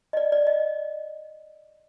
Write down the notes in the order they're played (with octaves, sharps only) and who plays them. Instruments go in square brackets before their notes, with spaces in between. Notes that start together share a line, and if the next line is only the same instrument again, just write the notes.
[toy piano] D#5
D5
D5
D#5